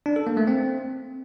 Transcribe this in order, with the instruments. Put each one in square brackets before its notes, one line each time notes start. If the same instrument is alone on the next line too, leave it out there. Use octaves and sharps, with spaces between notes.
[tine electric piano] D4
A4
A#3
A3
C4